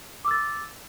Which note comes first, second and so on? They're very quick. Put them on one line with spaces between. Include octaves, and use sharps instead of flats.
D6 E6 A6